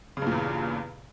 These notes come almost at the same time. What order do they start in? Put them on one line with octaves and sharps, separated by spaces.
C#3 G2 A#2 E2